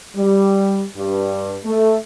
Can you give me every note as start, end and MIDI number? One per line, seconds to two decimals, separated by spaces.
0.16 0.83 55
0.95 1.56 43
1.64 1.95 57